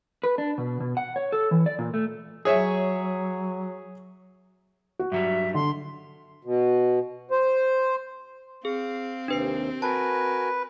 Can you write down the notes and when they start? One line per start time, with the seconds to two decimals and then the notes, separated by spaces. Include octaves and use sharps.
0.24 B4
0.38 D4
0.58 B2
0.80 B2
0.97 F#5
1.16 C#5
1.32 A4
1.51 E3
1.66 D5
1.79 A#2
1.94 A3
2.45 F#3 G#4 C#5 E5
4.99 F#4
5.12 G2 F#3 G3 E5
5.54 D3 C6
6.44 B2
7.31 C5
8.65 C4 G#4 F5
9.28 D#2 C3 D4 B4 C7
9.82 F#4 A#4 B4 G#5 A5